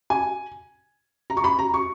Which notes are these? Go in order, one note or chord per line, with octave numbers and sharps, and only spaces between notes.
G#5
A#5
C#6
B5
A#5
C#6